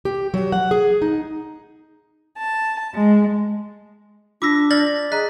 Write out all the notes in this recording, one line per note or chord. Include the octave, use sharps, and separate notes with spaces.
G4
F#3
F#5
G#4
D#4
A5
G#3
D4 F4 D6 E6 A#6 B6
D5 F6 A6 A#6 F#7
G#4 D#5 A#5 F#6 B6